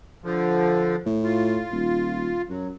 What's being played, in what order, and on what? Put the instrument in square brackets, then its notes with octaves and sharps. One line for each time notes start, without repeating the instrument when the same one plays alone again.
[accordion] D3 F3
[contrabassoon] A2
[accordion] F4
[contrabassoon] D#1
[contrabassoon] F#2 [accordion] F#3